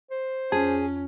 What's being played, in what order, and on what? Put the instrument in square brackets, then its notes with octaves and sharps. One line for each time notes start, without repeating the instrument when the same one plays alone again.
[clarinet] C5
[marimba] F2 [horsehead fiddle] C#4 [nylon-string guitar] G#4